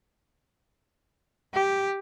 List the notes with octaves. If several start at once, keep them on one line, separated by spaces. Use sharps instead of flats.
G4